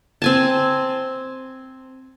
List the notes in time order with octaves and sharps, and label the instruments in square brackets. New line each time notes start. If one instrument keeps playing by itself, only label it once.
[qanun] C4 G#5 A5